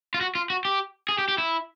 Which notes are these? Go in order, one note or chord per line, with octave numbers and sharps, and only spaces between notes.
F4
F#4
F4
F#4
G4
G#4
G4
G4
E4